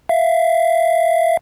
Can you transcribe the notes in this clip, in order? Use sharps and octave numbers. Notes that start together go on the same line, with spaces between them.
E5 F5